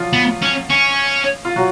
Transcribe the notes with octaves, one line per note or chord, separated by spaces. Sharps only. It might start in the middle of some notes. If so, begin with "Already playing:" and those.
Already playing: F3 F#3 F4
B3
C#4
C#4
F4
F#3 F#4